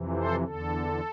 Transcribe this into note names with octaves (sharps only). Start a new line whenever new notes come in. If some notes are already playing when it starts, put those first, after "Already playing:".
Already playing: F2 C3 E3
A4 C5
E2 D3 A4